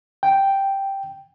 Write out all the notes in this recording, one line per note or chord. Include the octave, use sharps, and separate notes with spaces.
G5